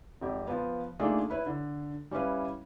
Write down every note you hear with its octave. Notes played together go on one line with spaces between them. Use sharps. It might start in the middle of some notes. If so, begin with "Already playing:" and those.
G#1 F2 G4
F3 B3
A3 A#3 D4 D#4 F4 G#4
E4 B4 C#5
D3
G3 C#4 E4 B4 F5